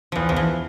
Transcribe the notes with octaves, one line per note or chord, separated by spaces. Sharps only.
E2 E3 F3
E2 F3
E3